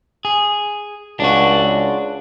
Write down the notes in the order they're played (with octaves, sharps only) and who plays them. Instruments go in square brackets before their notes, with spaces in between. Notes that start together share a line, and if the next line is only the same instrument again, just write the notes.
[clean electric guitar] G#4
[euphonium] C#2 [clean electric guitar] D4 F#4